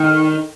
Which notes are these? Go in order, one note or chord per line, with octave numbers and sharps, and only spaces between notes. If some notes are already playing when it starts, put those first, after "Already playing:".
Already playing: D#3